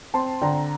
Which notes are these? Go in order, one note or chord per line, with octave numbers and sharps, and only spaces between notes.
C4 A5 C6
D3 G5 A#5